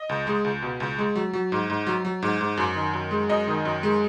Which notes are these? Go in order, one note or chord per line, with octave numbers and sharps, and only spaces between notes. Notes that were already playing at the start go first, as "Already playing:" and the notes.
Already playing: D#5
C#2
G#3
C#2
B2
C#2
G#3
F#3
F#3
G#2
G#2
F#3
F#3
G#2
G#2
F#2
D#3
F#2
G#3
F#2 D#5
D#3
F#2
G#3